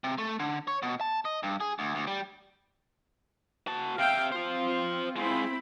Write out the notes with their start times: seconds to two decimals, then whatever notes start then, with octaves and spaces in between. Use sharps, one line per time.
0.04 C3
0.18 A3
0.40 D3
0.68 C#5
0.83 B2
1.01 A5
1.25 D#5
1.43 G2
1.61 G#4
1.79 D2
1.95 D2
2.07 G3
3.67 F#4 A5
3.99 C3 E5 F5 G5
4.32 C4 F4 C5 F5
5.16 G#3 C4 E4 F4 B5